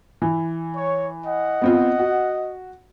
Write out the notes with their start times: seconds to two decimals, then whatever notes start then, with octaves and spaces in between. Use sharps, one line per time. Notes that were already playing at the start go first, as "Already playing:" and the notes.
0.22 E3
0.76 C#5
1.26 D#5 F#5
1.62 B3 C4 F4
1.99 F#4